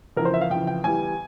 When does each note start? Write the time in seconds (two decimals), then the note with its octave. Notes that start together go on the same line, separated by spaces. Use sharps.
0.17 F2 C#3 E3 A#4
0.25 C5
0.34 E5
0.41 F5
0.50 F2 C#3 E3 G5
0.67 G5
0.84 E2 E3 G3 G#5